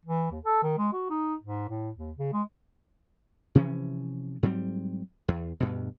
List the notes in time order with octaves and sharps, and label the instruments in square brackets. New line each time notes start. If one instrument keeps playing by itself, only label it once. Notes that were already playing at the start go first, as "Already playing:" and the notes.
[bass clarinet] E3
D#2
A4
D#3
G#3
F#4
D#4
G#2
A2
D#2
C#3
G#3
[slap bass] C3 E3 F3 C#4
G#2 F#3 G3 C4
E2
D2 G2 B2